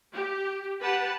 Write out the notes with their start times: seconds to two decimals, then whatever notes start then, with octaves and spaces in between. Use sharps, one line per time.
0.13 G4
0.81 G4 B4 F#5 A5